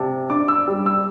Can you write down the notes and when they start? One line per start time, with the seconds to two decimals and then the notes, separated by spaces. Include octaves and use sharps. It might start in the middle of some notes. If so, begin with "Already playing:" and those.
Already playing: C3 A5
0.30 D4 D6
0.48 E6
0.68 G3
0.86 E6